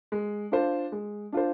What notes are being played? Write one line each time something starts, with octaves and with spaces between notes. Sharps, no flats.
G#3
D4 F4 C5
G#3
D4 F4 C5